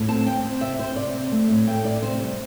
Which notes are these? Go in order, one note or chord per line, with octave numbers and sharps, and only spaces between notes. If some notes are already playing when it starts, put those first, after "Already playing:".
Already playing: A2
C4 A5
C4 G5
C4
C3 E5
C3 C5
C3 D5
C4
A3
A2
A3 G5
A2 D5
C3 C5
G3